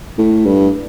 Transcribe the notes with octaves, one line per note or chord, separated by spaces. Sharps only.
A2
G2